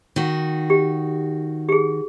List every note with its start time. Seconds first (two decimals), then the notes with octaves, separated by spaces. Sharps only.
0.16 D#3 F#4
0.70 G4
1.69 G4 G#4